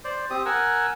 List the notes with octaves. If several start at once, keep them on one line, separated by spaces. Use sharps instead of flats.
C5 D5
C4 G4 D#6
A#4 F#5 G#5 E6